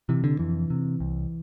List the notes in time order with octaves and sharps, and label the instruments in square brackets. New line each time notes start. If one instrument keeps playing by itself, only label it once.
[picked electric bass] C3 E3
D3
F2 E3
C3
C2